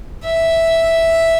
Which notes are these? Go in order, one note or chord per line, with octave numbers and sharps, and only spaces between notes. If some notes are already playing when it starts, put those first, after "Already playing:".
E5